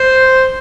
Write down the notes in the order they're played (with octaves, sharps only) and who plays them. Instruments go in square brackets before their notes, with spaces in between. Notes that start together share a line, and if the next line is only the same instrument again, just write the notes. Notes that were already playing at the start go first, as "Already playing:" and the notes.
Already playing: [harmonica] C5